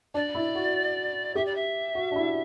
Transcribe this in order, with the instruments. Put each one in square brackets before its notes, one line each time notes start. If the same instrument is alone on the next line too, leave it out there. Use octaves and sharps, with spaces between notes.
[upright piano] D4 [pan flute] D5
[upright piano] E4
F#4
[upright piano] G4 [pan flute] E5
[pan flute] D5
E5
[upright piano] F#4
D4
E4